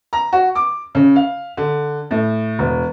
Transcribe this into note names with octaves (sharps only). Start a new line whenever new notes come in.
A#5
F#4
D6
C#3
F5
D3
A2
E1